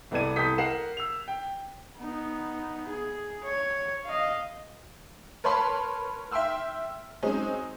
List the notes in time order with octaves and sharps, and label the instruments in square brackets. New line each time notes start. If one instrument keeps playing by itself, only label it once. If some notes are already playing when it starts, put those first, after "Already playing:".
[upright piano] C2 B3 A4 D5 G#6 D#7
C2 A4 D#6 G6 B6
A#4 F#5 C7 E7
E6 F7
G5
[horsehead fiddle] B3 D#4
G#4
C#5
D#5 F5
[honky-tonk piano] A#4 B4 C#5 A5 B5 C6
E5 G5 C6 E6 F6
F#3 G#3 C4 C#4 D#4